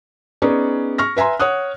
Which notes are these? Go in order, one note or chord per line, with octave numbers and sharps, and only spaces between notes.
B3 C#4 D#4 G#4 D5
C#6 F6 A#6
B4 E5 G#5 A#5 C6
C#5 F#5 D#6 F#6